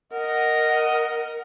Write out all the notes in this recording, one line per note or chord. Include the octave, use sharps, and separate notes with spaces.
A#4 D#5 F#5